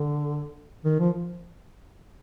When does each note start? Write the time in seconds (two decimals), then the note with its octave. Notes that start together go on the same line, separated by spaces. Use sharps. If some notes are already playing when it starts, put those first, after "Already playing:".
Already playing: D3
0.85 D#3
1.00 F3